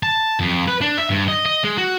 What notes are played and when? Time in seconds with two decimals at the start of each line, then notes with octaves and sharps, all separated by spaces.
0.03 A5
0.40 F2
0.68 B4
0.81 D4
0.97 E5
1.10 G2
1.28 D#5
1.46 D#5
1.64 G#3
1.78 F#4